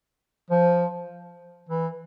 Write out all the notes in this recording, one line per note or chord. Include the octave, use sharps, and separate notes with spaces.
F3
E3